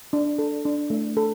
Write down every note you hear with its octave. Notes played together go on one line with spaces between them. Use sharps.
D4
A4
D4
A3
A4